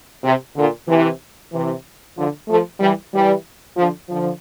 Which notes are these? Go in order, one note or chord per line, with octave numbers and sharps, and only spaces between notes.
C3
A#2 D3
C3 E3
C3 E3
D3 F3
F3 A3
E3 G3
E3 G3
D3 F3
D3 F3